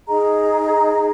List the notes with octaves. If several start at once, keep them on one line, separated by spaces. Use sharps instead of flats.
D#4 G#4 D#5 A#5